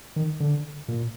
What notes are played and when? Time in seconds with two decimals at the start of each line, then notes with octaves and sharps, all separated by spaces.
0.16 D#3
0.40 D3
0.88 A#2